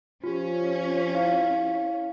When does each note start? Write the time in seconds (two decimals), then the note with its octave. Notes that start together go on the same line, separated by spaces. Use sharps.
0.24 F3 C#4 F4 G4
1.13 E4 F5